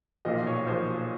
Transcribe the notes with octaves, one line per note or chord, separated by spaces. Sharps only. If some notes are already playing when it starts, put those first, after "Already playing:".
B1 A#2 F3 D#5
C#5
B1 A#2 F3 C5